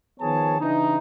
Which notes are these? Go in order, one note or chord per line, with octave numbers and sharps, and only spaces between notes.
D#3 F3 B3 G#4 C#5 A5
C#3 E3 D4 D#4